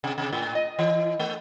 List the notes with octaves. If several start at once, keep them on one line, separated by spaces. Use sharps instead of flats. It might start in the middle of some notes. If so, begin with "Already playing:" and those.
C3
C3
A2
D#5
E3
A3